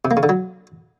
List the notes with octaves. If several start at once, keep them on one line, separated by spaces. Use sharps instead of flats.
C3
A#3
C#3
D3
F#3